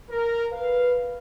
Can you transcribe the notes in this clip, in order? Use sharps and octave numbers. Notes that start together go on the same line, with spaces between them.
A#4
B4 F5